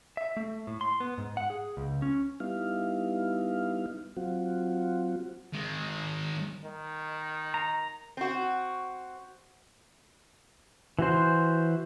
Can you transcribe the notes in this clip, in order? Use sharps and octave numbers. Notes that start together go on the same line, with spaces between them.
E5
A3
A2
C6
B3
G#2
F#5
G#4
C#2
C#4
G3 B3 D#4 E4 F5
F#3 C4 F4 F#4
D#3 G#3
D#3
A#5
C4 F#4
E3 F#4 C5